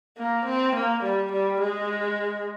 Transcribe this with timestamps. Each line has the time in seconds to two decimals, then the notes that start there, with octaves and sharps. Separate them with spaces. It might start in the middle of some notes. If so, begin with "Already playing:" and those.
0.18 A#3
0.46 C4
0.75 A#3
1.03 G3
1.32 G3
1.61 G#3